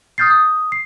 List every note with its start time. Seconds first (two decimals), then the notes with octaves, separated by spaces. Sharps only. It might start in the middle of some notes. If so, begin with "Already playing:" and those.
0.18 D#6 F6 G6 A6 C7
0.30 D#6
0.72 C7